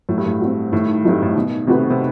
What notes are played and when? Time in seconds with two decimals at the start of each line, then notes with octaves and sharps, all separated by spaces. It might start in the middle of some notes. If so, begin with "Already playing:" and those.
0.09 A2 F#3
0.17 G2
0.26 A2
0.41 C4 F#4
0.72 A2 D#3
1.04 G2 F#3 A3 C4 D#4
1.23 A2
1.36 B2 D#3
1.67 C3 A3 C4 F#4 B4
1.90 C3